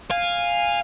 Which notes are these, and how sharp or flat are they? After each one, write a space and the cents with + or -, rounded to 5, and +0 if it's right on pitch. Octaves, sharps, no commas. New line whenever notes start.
F5 +0 G#5 -15